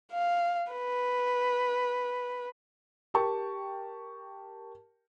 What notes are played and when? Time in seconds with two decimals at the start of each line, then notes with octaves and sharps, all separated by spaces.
0.12 F5
0.72 B4
3.14 G4 A#4 G5 A5 C#6